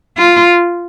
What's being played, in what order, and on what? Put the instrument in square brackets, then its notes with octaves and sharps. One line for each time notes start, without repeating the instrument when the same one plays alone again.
[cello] F4